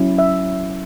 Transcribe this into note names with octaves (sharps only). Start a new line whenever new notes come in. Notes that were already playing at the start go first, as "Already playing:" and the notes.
Already playing: F#3 C#4 E4
E5